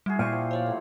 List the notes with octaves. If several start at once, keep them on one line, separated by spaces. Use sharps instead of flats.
G3 E4 F#4 G#4
A#2 G4 C5 C#6 F6
F3
F3 F4 C5 C#5
A2 F#3